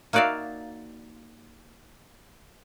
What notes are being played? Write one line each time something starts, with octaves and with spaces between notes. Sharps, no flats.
A#3 D#4 F#4 D5 E5 F5